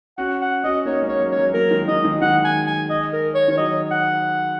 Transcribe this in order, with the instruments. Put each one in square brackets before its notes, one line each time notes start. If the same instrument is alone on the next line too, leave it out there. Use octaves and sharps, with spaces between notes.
[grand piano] C#4 F#4 [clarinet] F#5
[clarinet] F#5
[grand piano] C#4 F#4 [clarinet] D#5
[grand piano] A#3 D#4 [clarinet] C#5
[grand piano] G#3 C#4
[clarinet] C#5
[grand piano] F#3 A#3
[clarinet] C#5
[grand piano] F#3
[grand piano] F#3 A#3 [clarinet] A#4
[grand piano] D#3 G#3
[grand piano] D#3 G#3 [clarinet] D#5
[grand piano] D#3 G#3
[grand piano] D#3 G#3 [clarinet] F#5
[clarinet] G#5
G#5
D#5
A#4
C#5
[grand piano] D#3 [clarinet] C#5
[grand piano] F#3 [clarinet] D#5
[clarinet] F#5